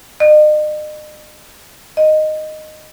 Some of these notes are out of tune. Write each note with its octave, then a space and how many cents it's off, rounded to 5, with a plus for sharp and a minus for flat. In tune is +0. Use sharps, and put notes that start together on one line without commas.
D#5 -40
D#5 -10